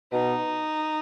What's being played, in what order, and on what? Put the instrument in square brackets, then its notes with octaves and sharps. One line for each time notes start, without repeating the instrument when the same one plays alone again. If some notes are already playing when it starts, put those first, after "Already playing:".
[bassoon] B2 [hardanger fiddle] D#4